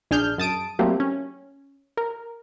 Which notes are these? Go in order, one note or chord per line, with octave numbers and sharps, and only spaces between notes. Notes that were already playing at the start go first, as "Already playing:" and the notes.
A#1 D4 G#4 F6 G6
F#2 A5 D#6 D7
F#3 G3 A3 A#3 C4
C#4
A#4